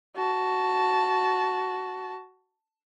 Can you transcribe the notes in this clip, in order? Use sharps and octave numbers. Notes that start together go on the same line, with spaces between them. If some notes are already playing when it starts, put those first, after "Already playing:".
F#4 A5